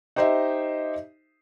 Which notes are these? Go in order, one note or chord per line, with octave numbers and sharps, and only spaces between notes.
D#4 G4 C5 D#5 E5